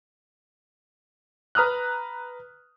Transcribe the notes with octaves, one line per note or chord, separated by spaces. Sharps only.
B4 A#5 D#6 F6 F#6